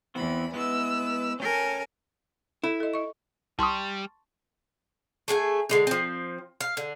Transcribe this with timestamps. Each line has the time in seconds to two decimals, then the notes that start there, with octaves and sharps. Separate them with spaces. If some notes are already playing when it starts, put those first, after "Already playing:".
0.15 E2 E3 B3 C4 B5
0.53 G#3 B3 E4 B4 E6
1.40 C#4 A4 A#4 G5 G#5
2.64 E4 A4
2.80 A4 D#5
2.94 D#5 C#6
3.59 C2 G3 A5 C6 C#6 D#6
5.28 A3 G#4 F#5 G#5
5.69 D3 G#3 D#4
5.87 F3 C4
6.61 F5
6.77 D3